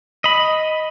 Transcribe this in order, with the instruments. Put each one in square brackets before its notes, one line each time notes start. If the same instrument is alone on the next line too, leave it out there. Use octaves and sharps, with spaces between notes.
[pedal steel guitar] D#5 B5